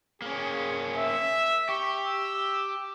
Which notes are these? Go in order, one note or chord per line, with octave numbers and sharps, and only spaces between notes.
A#3 C#4 G#4
E5
G4 C#6
E6